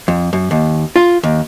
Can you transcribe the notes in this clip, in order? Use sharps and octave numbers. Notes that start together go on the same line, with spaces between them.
F2
F#2
D#2
F4
D#2